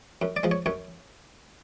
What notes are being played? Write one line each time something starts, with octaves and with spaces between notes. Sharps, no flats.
F#2
D5
F3 G#3
C#5
F#2 C#5